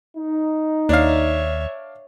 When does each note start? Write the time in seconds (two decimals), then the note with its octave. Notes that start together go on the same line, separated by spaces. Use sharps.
0.17 D#4
0.89 D#2 D4 C#5 E5 F5